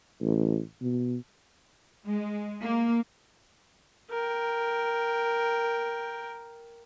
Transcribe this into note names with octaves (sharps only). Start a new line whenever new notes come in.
A1
B2
G#3
A#3
A#4 G5